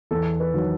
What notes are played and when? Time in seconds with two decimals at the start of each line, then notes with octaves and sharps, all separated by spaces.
0.11 E2 A4
0.40 B4
0.54 D#3 F#3